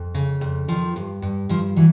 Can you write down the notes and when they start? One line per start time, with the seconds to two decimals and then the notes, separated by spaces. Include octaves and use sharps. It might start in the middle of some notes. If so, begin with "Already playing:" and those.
Already playing: F2
0.15 C#3
0.41 F2
0.68 D#3 F3
0.96 G2
1.22 G2
1.49 G2 F3
1.76 E3 F#3